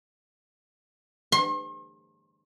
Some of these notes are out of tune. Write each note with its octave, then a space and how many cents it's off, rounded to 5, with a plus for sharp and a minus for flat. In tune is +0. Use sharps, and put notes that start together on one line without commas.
C6 +45